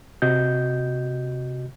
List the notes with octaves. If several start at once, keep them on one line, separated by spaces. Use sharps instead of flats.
C3 F#4 D#5 G6